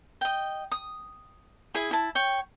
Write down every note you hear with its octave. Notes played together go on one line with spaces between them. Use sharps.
D#5 G5
D#6
E4 G#4 G#5
E4 A5
C#5 G5